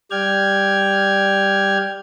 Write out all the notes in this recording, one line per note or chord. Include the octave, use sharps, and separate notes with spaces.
G3 D5 G5 F6 G#6